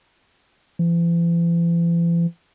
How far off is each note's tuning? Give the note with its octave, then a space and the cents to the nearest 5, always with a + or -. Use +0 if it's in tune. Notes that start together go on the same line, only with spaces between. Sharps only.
E3 +45